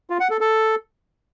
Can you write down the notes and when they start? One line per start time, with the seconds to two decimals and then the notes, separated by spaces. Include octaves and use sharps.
0.10 F4
0.20 F#5
0.30 A4
0.41 A4